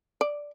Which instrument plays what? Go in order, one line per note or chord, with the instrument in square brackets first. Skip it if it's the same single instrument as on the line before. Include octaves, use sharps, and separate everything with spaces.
[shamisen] D5